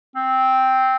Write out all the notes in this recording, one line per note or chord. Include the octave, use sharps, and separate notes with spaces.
C4